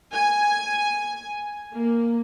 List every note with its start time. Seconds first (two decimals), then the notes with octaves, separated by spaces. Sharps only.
0.15 G#5
1.75 A#3